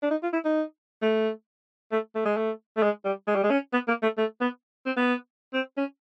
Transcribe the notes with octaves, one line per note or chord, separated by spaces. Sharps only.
D4
D#4
F4
E4
D#4
A3
A3
A3
G#3
A3
A3
G#3
G3
G#3
G3
G#3
C#4
B3
A#3
A3
A3
B3
C4
B3
C4
C#4